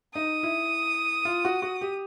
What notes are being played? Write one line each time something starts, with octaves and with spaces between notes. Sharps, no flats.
D#4 D#6
E4
F4
F#4
F#4
G4